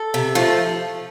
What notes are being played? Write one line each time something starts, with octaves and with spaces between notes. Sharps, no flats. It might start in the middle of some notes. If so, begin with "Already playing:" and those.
Already playing: A4
C3
F3 A3